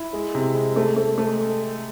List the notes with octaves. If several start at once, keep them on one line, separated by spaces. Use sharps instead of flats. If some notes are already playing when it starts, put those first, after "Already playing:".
Already playing: E4
G#3
C3
G#3
A3
A3
A3